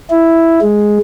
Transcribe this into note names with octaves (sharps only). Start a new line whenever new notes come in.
E4
G#3